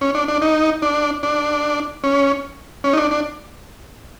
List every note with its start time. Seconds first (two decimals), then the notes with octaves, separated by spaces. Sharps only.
0.01 C#4
0.15 D4
0.28 D4
0.42 D#4
0.82 D4
1.23 D4
2.04 C#4
2.84 C#4
2.93 D#4
2.97 D4
3.11 D4